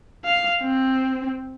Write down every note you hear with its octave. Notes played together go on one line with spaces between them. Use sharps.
F5
C4